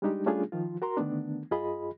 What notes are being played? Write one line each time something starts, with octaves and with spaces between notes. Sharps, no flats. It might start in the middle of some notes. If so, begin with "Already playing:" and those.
G3 G#3 D4 D#4 G4
G3 A3 C#4 D4 F4 G#4
D#3 F3 F4
F#4 A#4 A#5 C6
D3 D#3 A3 B3 D4
F#2 F4 G#4 D#5 B5